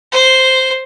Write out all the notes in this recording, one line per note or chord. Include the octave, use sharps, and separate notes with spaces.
C5